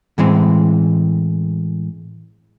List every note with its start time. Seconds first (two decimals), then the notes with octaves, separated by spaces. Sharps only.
0.18 A2 E3 G#3 C4